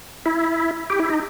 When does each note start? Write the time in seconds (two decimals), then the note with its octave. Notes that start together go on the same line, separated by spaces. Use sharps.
0.26 E4
0.90 G4
0.99 E4
1.10 D#4